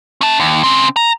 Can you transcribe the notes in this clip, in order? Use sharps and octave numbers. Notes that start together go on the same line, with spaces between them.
C#4 A5
D#2
C#3 C4
A#5